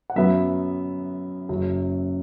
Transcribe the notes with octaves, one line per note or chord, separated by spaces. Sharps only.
F#5
F#2 F#3 B3 E5
F#1 F#2 F#3